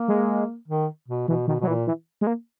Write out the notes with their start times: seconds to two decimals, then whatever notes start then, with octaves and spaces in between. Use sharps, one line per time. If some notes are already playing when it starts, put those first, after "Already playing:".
Already playing: A#3
0.08 G#3
0.68 D#3
1.08 B2
1.28 B2 E3
1.47 B2 D#3
1.60 B2
1.63 F#3
1.67 A#2 E3
1.87 E3
2.21 G#3
2.27 A#3